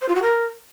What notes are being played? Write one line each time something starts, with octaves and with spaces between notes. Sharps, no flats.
C5
F4
F#4
A#4